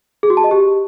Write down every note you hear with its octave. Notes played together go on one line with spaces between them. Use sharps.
G#4
F#4
A5
D#5
G4